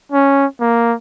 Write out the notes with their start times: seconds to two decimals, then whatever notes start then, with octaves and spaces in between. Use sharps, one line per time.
0.12 C#4
0.60 A#3